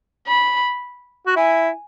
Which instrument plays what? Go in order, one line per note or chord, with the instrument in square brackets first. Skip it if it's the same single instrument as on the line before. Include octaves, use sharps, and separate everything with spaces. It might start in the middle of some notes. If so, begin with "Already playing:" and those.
[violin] B5
[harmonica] F#4
[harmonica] E4 [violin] G#5